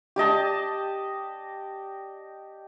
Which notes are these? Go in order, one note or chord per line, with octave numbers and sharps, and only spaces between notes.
G4 D5 D#5 A5